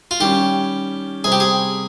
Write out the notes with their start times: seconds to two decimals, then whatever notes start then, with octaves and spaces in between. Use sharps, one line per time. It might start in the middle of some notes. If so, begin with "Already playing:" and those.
0.11 F4
0.20 D#3 G3 C#4 G4
1.24 C3 G3 C4 G#4
1.32 G4
1.40 G#4